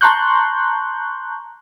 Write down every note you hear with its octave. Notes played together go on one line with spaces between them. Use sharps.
A5 A#5 C6 C#6 F#6 G6